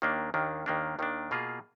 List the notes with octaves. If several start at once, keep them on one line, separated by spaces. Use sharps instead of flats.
D#2 D#3 A#3 D4
D#2 D#3 A#3 D4
D#2 D#3 A#3 D4
D#2 D#3 A#3 D4
B2 A#3 F4 G#4